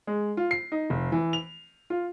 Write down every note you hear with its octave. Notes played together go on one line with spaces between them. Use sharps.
G#3
F4
C7
D#4
F1
E3
F7
F4